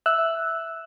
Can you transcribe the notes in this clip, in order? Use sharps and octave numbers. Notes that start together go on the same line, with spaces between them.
E5 E6 F#6